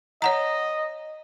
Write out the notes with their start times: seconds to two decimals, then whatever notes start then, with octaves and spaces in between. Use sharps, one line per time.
0.22 C#5 D#5 F#5 A#5